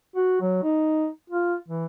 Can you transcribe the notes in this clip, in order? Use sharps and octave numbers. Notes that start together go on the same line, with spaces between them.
F#4
F#3
D#4
F4
E3